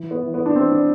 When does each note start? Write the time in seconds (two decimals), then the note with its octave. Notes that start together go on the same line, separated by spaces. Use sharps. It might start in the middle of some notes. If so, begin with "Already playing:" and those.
Already playing: E3
0.11 B3
0.23 E3
0.34 B3
0.46 D4
0.56 E3 C4
0.72 D4